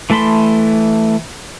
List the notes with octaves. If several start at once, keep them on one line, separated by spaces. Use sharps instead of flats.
E3 A3 A5 B5 C6